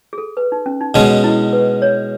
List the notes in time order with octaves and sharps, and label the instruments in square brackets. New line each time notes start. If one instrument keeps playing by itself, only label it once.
[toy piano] G#4
A4
B4
D#4
C#4
D#4
[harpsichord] B2 G#3 C#4 [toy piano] D#4
[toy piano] E4
B4
C#5